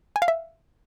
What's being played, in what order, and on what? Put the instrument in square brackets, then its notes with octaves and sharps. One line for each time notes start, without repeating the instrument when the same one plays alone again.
[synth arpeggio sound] G#5
F5
E5